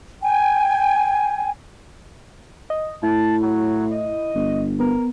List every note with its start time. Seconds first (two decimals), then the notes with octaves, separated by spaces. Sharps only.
0.22 G5 G#5
2.70 D#5
3.03 A2 E4 A5
3.42 F#3
3.91 D#5
4.35 G1
4.80 B3 A#4